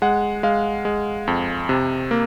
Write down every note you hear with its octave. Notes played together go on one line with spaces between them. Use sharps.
G#3 F#5
G#3 F5
G#3
F2
C3
A#3